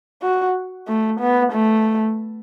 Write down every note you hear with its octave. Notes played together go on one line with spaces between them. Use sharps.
F#4
A3
B3
A3